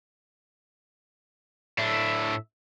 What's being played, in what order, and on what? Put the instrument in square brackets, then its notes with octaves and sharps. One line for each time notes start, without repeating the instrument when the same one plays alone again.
[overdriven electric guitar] A2 D4 [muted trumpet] E5